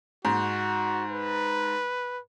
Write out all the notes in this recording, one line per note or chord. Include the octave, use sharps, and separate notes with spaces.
G#2 F#4
B4